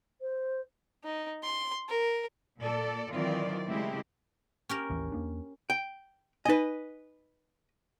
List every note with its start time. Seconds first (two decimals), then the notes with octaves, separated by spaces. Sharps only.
0.21 C5
1.04 D#4
1.43 C6
1.89 A#4
2.58 A#2 A4 D5
3.11 D#3 E3 F#3 C4 F4 D5
3.68 C#3 G#3 A3 C4 E4 G4
4.69 C#4 G4 A#4
4.90 A1 D#2 E3
5.12 E2 A#3 D4
5.70 G5
6.45 D#4 B4 D#5 G#5